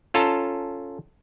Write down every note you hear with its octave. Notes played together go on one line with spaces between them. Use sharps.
C#4 F4 A4 A5 A#5